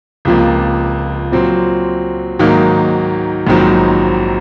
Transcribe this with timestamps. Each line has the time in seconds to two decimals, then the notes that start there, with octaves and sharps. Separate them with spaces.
0.25 C#2 C3 F3 A#3
1.32 A#2 F#3 C4
2.39 G#2 D#3 F#3 A#3
3.47 A#1 G#2 D#3 F#3 C4